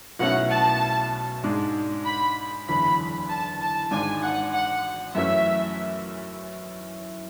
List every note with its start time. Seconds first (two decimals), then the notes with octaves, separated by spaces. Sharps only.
0.19 B1 B2 A3 C#4 E4 F#5
0.50 A5
1.44 G#2 G#3 D4
2.05 B5
2.67 F#1 E2 D3 B5
3.29 A5
3.60 A5
3.91 G#1 G#2 G#3 D4 G#5
4.22 F#5
4.53 F#5
5.15 F#2 E3 A3 C#4 E4 E5